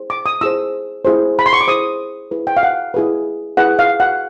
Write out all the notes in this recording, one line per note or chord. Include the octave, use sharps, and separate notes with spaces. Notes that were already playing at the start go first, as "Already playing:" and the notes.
Already playing: E4 G#4 C5
D6
D#6
E4 G#4 C5 E6
E4 G#4 C5
B5
C6
C#6
D6
E4 G#4 C5 D#6
E4 G#4 B4
G5
F5
F#5
E4 G#4 B4
E4 G#4 B4 F#5
F5
F#5